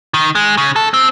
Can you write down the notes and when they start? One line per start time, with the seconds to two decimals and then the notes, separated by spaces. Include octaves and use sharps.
0.14 D#3
0.35 G#3
0.57 C#3
0.76 A4
0.94 C4